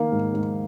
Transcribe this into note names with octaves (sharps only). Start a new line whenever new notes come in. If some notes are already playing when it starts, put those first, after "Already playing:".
Already playing: D#3 A#3 F5
G#2
G#2